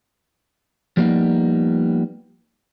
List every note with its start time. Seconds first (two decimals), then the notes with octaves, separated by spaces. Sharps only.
0.97 F3 G3 A#3 B3 D#4